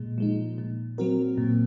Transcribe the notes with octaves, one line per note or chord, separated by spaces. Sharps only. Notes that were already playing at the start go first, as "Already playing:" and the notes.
Already playing: A#2 G#3
F3 G#3 D#4
A#2
F#3 C4 F#4 A#4
A#2